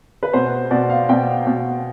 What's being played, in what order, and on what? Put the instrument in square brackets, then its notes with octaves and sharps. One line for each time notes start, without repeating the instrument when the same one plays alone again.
[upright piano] B4
B2 C5
B2 D5
F5
B2 G5
B2